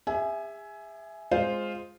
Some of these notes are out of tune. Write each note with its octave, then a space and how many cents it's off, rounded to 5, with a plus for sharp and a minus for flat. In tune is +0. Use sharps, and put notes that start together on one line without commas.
G#4 -40 E5 +0 G#5 +15
G#3 +0 F4 +0 C5 +0